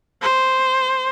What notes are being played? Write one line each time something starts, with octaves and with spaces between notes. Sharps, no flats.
C5